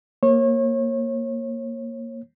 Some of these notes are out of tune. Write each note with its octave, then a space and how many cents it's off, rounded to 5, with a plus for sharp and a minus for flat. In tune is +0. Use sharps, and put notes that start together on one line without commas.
A#3 +0 C#5 -30